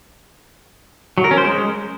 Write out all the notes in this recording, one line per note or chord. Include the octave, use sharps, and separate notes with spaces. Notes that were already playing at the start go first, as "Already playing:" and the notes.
F#3
A#4
C#4
C5
G#3